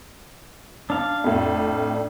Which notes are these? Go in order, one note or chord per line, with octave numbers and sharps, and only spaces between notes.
D4 F5
F2 A2